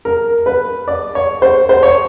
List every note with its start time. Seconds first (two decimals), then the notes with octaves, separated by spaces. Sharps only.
0.05 A#4
0.46 B4
0.88 D5
1.15 C#5
1.42 C5
1.69 C5
1.83 C#5